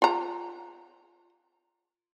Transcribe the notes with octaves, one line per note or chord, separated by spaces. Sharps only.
F4 A#5